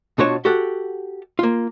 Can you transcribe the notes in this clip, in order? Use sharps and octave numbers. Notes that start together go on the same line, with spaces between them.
B2 D4 F4 F#4 C#5 A5
F#4 G4 A4 F#5
A#3 F4